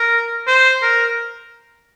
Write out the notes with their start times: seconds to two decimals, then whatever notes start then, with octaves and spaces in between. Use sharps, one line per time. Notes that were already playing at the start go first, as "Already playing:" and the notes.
Already playing: A#4
0.47 C5
0.82 A#4